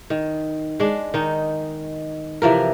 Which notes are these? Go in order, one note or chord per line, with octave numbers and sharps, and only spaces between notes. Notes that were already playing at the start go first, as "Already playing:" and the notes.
D#3
G#3 D4
D#3 D#4
C3 E3 F3 A#4